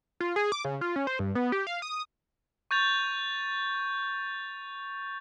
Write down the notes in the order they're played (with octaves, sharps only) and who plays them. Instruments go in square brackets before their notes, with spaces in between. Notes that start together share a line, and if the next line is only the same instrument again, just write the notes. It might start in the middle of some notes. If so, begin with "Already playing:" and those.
[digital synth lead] F4
G#4
D6
C#3
F4
C#4
C5
G2
B3
G4
F5
D#6
[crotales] C#6 G6 A6 F7